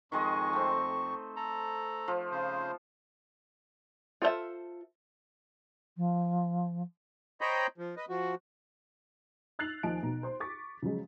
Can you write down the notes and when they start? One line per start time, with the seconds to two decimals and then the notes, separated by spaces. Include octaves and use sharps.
0.12 F2 D#3 G#3 D#5 C#6
0.53 A3 C4
1.36 A4 A#5
2.08 F3
2.31 C#3 C5
4.22 F4 A4 C5 C#5 E5
5.97 F3
7.41 C5 C#5 D#5 G5 A#5 B5
7.78 F3
7.97 B4 D#5
8.09 F3 F#4
9.59 E6 F#6 A6 C7 F7 F#7
9.83 D#2 F3 D#5 G#5 A5 D7
10.02 B1 B2 A#5
10.23 C5 C6
10.40 C#6 D6 A6 B6
10.82 C#3 F3 F#3 G#3